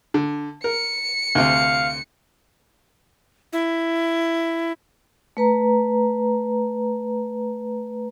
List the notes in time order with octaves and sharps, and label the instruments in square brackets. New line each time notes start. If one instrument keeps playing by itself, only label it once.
[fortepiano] D3
[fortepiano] A#4 [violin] C#7
[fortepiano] D2 C3 [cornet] F5
[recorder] E4
[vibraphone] A3 B4 A#5